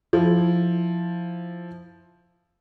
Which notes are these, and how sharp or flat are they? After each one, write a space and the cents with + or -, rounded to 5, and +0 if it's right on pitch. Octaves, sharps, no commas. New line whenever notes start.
F3 +0 E4 +0